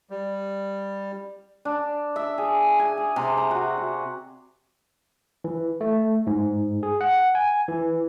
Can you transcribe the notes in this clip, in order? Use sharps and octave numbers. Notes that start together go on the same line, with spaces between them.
G3
D4
E5
G#4
G#5
G#4
C3
A#5
F#4
F#4
E3
A3
G#2
G#4
F#5
G#5
E3